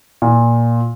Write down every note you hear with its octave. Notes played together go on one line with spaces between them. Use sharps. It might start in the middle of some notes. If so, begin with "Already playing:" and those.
A#2